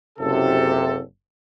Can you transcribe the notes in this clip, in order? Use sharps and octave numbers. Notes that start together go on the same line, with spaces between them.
F#1 C3 A4